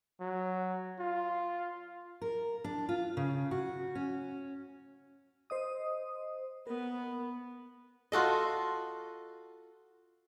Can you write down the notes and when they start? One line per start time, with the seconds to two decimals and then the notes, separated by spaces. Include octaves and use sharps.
0.21 F#3
1.00 F4
2.21 A#4
2.64 D4
2.89 F4
3.17 C#3
3.51 F#4
3.95 C#4
5.50 C5 D#5 D#6
6.67 B3 A#4
8.12 F4 F#4 A4 D#5